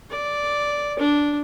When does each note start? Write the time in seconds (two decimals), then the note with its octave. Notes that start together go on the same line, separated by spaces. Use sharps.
0.10 D5
0.99 D4